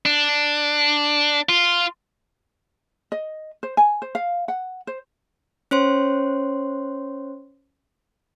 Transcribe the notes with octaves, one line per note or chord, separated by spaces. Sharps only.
D4
F4
D#5
C5
G#5
C5
F5
F#5
C5
C#4 C5 C#5 C6